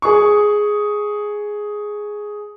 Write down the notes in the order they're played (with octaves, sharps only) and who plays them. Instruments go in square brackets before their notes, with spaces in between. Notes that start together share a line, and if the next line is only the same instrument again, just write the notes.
[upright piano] G#4 C#6